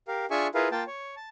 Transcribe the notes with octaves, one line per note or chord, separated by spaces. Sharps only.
G4 A#4 F5
D4 F4 G#4 E5 G#5 C#6
E4 F4 G#4 A#4 B4 F5
A#3 F4 G5 A5
C#5
A5